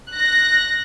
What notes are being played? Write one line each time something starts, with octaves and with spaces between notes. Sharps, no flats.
F#6 A#6